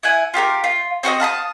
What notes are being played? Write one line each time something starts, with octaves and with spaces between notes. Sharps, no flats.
E4 F#5 G#5
F4 G4 A4 A#4
F4
C4 F#4 A#4 D#5
F5 A5 B5 D#6